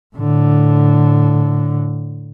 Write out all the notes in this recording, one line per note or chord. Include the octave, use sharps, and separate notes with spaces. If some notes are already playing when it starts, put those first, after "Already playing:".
A2 D3